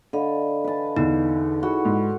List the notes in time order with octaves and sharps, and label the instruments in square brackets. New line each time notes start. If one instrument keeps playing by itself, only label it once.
[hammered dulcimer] D3 [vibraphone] D#5 F5 B5
[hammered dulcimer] B4 A5
[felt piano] E2 D3 [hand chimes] D#4
[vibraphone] E4 G#4 B5 [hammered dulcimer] F#4
[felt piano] G#2